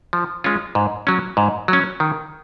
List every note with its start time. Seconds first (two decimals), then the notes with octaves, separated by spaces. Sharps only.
0.13 F3
0.44 G#3 C#4 F4
0.75 G#2
1.07 F#3 C#4
1.37 G#2
1.68 F#3 C#4
2.00 D#3